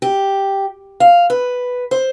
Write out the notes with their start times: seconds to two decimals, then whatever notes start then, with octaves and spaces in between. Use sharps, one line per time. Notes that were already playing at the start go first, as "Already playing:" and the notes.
0.02 G4
1.00 F5
1.30 B4
1.91 C5